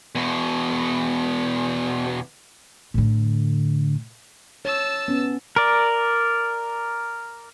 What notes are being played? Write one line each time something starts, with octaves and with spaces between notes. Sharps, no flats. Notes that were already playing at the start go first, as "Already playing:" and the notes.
E2 B2
A2 D3
C#5 A5 E6
B3 C#4
A#4 D5